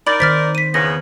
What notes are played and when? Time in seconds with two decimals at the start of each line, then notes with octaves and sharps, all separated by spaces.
0.07 D#4 A#4 D5 B5 A6
0.20 D#3 C5 F6 A6 B6
0.55 B6 D#7
0.74 E2 C#3 B3 A#6